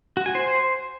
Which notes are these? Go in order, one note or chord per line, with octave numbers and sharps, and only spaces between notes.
F#4
G#5
C5